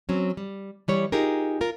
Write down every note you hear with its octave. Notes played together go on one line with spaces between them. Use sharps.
F#3 C4 C#4
G3
E3 G3 C#5
D#4 F4 G4 G#4 A#4
F4 A#4